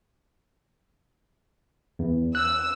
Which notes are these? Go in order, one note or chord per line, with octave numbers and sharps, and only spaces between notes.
E2
E6 F#6